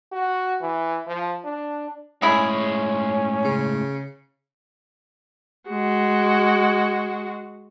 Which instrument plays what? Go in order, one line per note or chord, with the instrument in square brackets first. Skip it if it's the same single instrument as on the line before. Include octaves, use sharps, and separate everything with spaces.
[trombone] F#4
E3
F3
D4
[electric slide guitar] A2 G#3 [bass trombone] C#4 [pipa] E4 G#4
[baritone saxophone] C#3
[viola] G#3 F#4